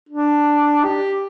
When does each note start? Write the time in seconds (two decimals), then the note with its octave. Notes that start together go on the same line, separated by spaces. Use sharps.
0.09 D4
0.84 G4